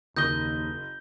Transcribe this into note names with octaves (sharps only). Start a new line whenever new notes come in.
F#1 D#2 D#6 G6 A#6 G7